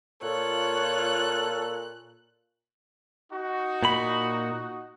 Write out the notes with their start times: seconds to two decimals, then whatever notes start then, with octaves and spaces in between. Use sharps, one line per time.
0.23 A#2 F4 A4 C#5 F#6
3.33 D#4 F#4
3.83 A#2 B5